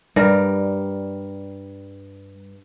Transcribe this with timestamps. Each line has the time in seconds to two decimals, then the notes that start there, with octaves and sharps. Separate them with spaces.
0.16 G2 G3 A#4